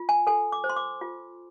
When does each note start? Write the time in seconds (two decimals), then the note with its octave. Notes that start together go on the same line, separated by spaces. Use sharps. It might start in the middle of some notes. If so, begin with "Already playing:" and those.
Already playing: F4
0.09 G#5
0.27 A4 G#5
0.52 D6
0.64 C5
0.69 C6
0.76 D6
1.01 F4